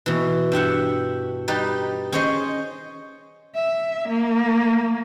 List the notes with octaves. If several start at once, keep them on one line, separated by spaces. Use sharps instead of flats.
B2 E3
G2 G4 E5 F#5
G3 D#4 G4 B4
C#4 G#4 C5 C#5 D#5
E5
A#3